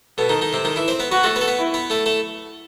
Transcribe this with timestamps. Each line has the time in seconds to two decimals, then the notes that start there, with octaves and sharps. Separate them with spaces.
0.18 B2 B3 A4
0.29 D#3 D#4
0.41 D#3 D#4
0.53 C3 C4
0.64 D#3 D#4
0.76 E3 E4
0.88 C4 C5
1.00 B3 B4
1.11 B3 F#4 B4
1.23 A3 A4
1.36 B3 B4
1.41 A4
1.48 B3 B4
1.59 E4
1.74 B3 B4
1.90 A3 A4
2.06 A3 A4